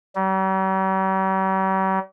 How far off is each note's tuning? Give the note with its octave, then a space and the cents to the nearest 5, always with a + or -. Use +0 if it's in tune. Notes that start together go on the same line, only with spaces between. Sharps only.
G3 -45